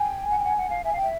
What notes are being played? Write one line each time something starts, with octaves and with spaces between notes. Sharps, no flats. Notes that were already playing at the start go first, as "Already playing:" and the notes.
Already playing: G5 G#5
F#5
G5
F#5
F#5
F5
E5 G#5
F5 G5
E5